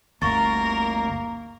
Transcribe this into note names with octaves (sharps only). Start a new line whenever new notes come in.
G1 D2 A#3 A#4 C#6 A6